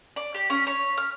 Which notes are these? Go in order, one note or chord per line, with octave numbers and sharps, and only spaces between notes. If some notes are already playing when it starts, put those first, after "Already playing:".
D5
G4
C#4
C#5
F6